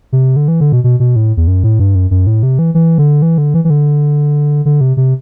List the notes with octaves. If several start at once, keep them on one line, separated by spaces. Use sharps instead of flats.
C3
D3
E3
D3
B2
B2
B2
A2
E2
F#2
A2
G2
F#2
F#2
A2
C3
E3
E3
D3
E3
D3
E3
E3
D3
D3
C3
C3